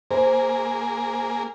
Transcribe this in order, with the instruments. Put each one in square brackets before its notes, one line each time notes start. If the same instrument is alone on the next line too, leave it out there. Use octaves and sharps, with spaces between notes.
[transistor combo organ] A#3 G#4 A#4 [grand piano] C5